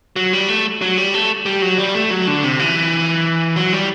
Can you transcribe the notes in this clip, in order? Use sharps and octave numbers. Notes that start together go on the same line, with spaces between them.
F#3
G3
A3
F#3
G3
A3
G3
F#3
G3
A3
F#3
D3
C3
E3
F#3
G3